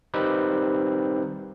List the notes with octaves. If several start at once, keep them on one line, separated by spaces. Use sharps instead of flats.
D#3 G3 C4 D#4 G4 B4